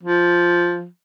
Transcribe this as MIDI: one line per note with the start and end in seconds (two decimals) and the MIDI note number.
0.03 0.87 53